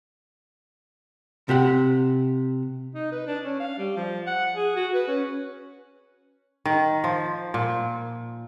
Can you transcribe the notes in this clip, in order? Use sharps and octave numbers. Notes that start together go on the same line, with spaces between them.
C3 G4 F#5
D#4
B4
D4
C#4
F5
G3
F3
F#5
G#4
F#4
B4
C#4
D#3
F3
A#2